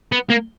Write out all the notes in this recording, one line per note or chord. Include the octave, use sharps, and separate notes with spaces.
B3
A#3